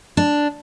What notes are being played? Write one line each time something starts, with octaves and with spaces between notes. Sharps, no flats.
D4